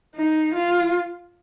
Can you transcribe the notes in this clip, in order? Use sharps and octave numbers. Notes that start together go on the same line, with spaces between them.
D#4
F4